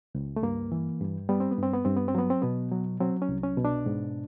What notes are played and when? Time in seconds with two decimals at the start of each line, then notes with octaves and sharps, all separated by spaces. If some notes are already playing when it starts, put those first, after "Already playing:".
0.15 C#2
0.36 A3
0.43 G2 A#3
0.72 E3
1.00 G2
1.29 G3 B3
1.40 C4
1.51 B3
1.58 G2 C4
1.74 B3
1.85 G2 C4
1.96 B3
2.08 C4
2.15 F#3 B3
2.30 C4
2.42 B2 B3
2.72 F#3
3.00 F#3 C4
3.22 C#4
3.29 C2
3.43 C#4
3.57 B2
3.65 D4
3.86 G#2